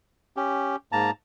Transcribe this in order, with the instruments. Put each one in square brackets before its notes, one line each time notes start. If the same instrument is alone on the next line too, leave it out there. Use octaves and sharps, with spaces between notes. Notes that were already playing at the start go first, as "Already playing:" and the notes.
[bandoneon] C#4 G4
G#2 A#3 A5 A#5